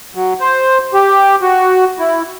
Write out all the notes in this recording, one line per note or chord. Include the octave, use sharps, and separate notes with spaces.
F#3
C5
G4
F#4
E4